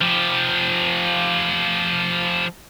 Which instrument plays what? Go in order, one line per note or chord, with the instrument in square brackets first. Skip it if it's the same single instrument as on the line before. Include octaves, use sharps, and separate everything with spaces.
[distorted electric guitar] F3 G4